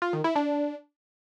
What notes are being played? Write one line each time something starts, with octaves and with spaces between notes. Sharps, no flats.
F4
D#3
E4
D4